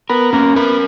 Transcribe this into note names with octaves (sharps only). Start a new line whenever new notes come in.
B3 A#4
A#3 C#4
B3 A#4